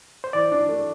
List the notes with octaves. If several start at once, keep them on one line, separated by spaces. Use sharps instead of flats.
C5
E3 D5
D4
A3